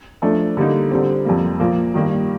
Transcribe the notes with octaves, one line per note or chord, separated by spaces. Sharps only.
F3 A3 D4
D3 G3 A#3 D#4
D3 G3 C4
F2 C3 G3 A#3
A#2 F3 A#3
G2 D#3 G3 A#3